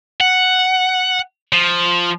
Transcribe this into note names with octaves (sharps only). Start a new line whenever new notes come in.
F#5
F3